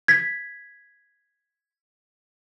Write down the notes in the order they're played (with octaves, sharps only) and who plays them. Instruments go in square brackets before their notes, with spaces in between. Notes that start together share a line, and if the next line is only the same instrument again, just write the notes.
[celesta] G#6 B6